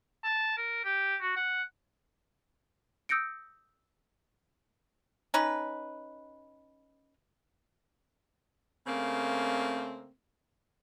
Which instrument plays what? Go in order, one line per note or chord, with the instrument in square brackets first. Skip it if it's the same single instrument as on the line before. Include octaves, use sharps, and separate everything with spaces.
[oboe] A5
A#4
G4
F#4
F#5
[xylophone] D#6 E6 G6 A#6 C#7 D7
[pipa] C#4 D#4 B4
[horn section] C#3 A3 A#3 C4